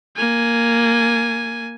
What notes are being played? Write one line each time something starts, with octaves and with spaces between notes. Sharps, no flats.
A#3 G#5